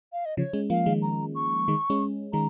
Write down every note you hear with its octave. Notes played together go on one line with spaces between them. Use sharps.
F5
D#5
C#3 F3 C#5
G#3 C#4
F3 A#3 F5
D#3 G#3
A#5
C#6
D#3 G#3
G#3 C#4
D#3 G#3 A#5